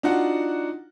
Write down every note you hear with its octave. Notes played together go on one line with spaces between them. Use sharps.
D4 D#4 F4 F#4 F#5